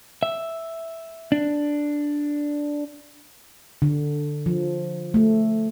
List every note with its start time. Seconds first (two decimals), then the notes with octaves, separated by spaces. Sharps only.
0.23 E5
1.32 D4
3.82 D3
4.46 F3
5.14 A3